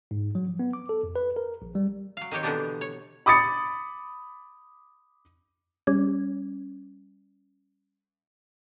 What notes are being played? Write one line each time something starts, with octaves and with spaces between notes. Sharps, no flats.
G#2
F#3
F3
B3
D6
A4
F2
B4
A#4
A#1
G3
F#3 F5
D#3 C4 G4 C#5
B2 D3 E3 B3 D4 G4
C#5
B5 D6 D#6 A6 C#7
G3 C#4